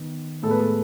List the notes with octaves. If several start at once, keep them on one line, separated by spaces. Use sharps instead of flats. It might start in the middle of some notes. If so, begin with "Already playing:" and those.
Already playing: D#3 B3
A2 G#3 B3 A4
B4
A4